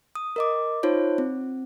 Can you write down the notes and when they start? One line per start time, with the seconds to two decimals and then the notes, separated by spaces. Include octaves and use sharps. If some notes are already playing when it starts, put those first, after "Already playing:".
0.15 D#6
0.36 A#4 D#5 D6
0.83 D#4 F4 C5 C#5
1.18 C4